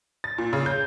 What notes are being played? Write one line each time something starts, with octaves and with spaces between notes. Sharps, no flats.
A6
A#2
C#3
G6